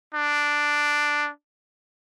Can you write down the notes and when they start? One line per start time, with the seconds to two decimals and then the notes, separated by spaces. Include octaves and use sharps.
0.14 D4